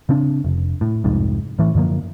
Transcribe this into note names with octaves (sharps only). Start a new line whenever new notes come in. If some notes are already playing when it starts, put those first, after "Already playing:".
C#3 C4 D4
F1
A2
C2 F2 G#2
A2 E3 A3
F#2 D3 F3 A#3